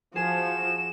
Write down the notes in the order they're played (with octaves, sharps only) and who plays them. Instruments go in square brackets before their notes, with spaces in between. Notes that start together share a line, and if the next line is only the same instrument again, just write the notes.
[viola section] F3 [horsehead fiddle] F#4 [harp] G#4 [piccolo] E7